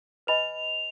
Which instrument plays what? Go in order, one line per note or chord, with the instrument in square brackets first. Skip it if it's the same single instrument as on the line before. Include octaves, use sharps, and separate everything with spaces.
[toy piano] B4 D#5 G#5 B5 [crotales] F7